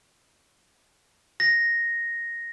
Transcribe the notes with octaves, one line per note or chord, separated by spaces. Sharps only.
A#6